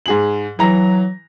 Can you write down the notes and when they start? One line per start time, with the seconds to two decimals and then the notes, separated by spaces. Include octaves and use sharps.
0.06 G#2 G#4 F#7
0.59 E3 F#3 A#5 A#6